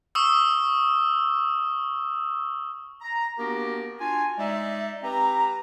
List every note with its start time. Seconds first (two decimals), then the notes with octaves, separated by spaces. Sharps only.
0.15 C#6 D#6 E6
3.01 A#5
3.38 A#3 B3 D4 F#4 G4 A#4
4.00 D4 F4 F#4 G#5
4.38 G#3 D#4 D5 E5
5.02 C4 G4 B4 A#5